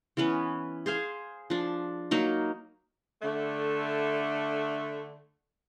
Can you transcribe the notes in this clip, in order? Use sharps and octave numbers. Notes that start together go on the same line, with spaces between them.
E3 B3 C#4 B4
G#4 C5 F5 G#5
F3 D4
F#3 A#3 D#4
D3 A3